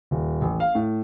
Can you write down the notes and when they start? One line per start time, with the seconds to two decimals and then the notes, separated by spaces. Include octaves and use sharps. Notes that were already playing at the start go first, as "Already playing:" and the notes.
0.11 D#1
0.41 A1
0.60 F5
0.75 A2